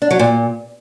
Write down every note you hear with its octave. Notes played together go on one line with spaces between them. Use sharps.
D4
F#3
A#2